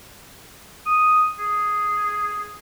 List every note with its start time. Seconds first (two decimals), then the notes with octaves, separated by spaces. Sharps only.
0.86 D#6
1.39 G#4